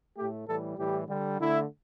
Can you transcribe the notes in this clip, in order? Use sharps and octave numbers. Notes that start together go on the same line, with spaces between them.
A2 A3 G4
A2 E3 G3 A4
A2 E3 G3 G4
D3 G3
D3 A3 E4